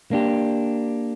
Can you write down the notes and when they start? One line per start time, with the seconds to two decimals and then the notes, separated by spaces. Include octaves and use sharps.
0.11 A#3 D4 G4